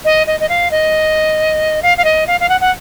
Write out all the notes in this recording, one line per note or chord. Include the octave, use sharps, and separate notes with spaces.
D#5
D#5
D#5
F5
D#5
F5
F5
D#5
F5
F5
F#5
F#5